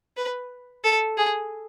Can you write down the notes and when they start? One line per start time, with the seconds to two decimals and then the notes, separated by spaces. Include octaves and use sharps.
0.17 B4
0.84 A4
1.18 G#4